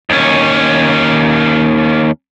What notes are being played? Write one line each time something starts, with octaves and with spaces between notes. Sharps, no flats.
D#2 C#4